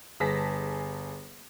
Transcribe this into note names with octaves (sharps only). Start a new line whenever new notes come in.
G1 G#4 A5 A#6 B6